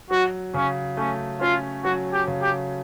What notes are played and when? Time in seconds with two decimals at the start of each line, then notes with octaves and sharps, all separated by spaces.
0.11 F#3 F#4
0.54 C#3 C#4
0.97 A3 C#4
1.41 C#4 F4
1.84 F#3 F#4
2.13 G4
2.27 C#3
2.42 G4